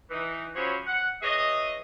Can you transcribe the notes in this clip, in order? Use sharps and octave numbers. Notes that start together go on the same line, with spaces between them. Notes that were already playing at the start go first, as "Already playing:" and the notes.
E3 D#4
F3 F#3 C#4 C5 C#5 B5
F#5
E3 G#4 C#5 D#5